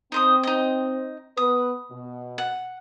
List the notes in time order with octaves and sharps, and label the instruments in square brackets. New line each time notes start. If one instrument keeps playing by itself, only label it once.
[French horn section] C4 [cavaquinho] D#4 C5 D#6
[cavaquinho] D#4 D#5
[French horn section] B3 B4 [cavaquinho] D#6
[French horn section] B2
[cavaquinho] F#5